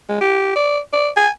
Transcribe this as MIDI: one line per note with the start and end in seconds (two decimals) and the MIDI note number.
0.09 0.20 56
0.21 0.52 67
0.56 0.79 74
0.93 1.09 74
1.16 1.30 80